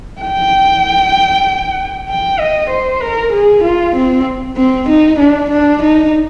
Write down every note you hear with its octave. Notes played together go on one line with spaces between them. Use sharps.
G5
G5
D#5
C5
A#4
G#4
F4
C4
C4
D#4
D4
D4
D#4